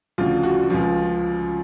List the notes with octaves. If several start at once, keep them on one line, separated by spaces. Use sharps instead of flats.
D2 C#3 F3 F4
F#4
C#2 C#3 F3 F4